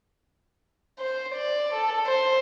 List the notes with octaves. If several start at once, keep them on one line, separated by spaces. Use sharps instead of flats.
C5
D5
A4
C5